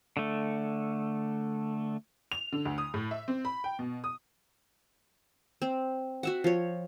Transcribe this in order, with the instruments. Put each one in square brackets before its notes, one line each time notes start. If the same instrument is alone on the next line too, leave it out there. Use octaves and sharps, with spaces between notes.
[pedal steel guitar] D3 A3
[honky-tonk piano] F7
D3
D2
D#6
A2
E5
C4
B5
G5
B2
D#6
[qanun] C4
F#4 E5 F#5
F3 C#5